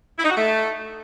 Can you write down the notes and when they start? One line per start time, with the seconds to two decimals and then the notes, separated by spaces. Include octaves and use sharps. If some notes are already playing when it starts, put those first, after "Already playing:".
0.18 E4
0.24 D#4
0.30 F#4
0.36 A3